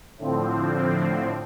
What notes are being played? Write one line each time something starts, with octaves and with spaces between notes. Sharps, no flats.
A2 D3 F3 C4